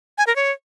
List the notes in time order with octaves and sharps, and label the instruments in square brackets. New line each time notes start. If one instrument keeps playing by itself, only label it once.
[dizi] G#5
A#4
C#5